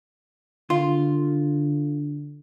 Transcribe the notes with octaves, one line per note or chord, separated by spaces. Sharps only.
D3 F4